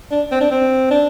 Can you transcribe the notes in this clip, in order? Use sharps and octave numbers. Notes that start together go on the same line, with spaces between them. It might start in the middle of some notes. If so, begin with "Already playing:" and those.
D4
C4
D4
C4
D4